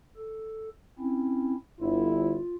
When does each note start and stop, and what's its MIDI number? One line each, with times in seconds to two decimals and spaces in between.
0.17 0.70 69
0.99 1.55 60
0.99 1.55 61
0.99 1.55 64
1.80 2.39 31
1.80 2.39 64
1.80 2.56 65